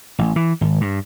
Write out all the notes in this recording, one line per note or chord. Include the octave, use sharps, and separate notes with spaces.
A1
E3
G#1
G2